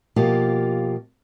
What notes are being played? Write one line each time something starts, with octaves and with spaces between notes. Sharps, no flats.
B2 F3 A#3 F4 G4